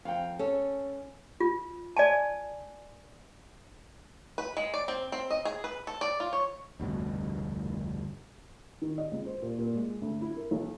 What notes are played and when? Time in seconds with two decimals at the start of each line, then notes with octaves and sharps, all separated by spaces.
0.05 F2 F5 G5
0.39 C#4 A4
1.40 F4
1.97 D5 G#5 A5
4.38 B4
4.57 G#3
4.74 D5
4.88 C4
5.12 C4
5.31 D#5
5.45 G#4
5.64 B4
5.87 A4
6.01 D5
6.20 F4
6.33 C#5
6.79 F1 D2 G2 B2
8.82 D#3
8.98 D#5
9.12 C#2
9.26 C5
9.42 A#2
9.59 A#2
9.75 G#3
10.02 D2
10.21 E4
10.37 A#4
10.51 B1